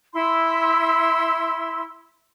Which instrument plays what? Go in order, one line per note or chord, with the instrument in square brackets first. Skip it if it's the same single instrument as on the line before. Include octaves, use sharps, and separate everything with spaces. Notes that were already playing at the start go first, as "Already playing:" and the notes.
[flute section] E4 C6